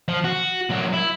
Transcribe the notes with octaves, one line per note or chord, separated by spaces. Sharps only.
F3
F#4
A#2 F#3
E4